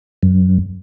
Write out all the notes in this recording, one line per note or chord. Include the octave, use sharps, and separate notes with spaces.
F#2